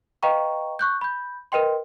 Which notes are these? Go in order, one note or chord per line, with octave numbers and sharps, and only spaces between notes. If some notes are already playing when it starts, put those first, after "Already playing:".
B4 D#5 F5 G5 A#5 C#6
C#6 F#6 G6
B5 G6
A#4 B4 D#5 G5 C6